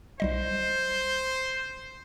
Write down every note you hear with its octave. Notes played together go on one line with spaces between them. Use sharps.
B1 G3 C5 D#5